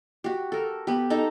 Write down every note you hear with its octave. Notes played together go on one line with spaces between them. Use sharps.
F#4 G4
A4 A#4
B3 G4
D#4 A4 A5 A#5